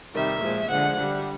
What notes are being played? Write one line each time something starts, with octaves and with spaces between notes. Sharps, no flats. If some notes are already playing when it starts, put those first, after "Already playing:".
C3 D#3 G3 E5
A#2 F3 G#3
D3 F3 G#3 F#5
D3 G3